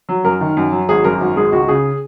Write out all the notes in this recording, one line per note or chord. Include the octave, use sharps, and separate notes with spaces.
F#3
F#2 A#4
D#3
F#2
F#3
G#1 G#4
F#2 A#4
G#1
G#3 G#4
C#2 F#4
C#3 G#4